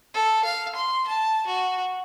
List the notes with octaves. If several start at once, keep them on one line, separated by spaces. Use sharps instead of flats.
A4
F5
C6
A5
F#4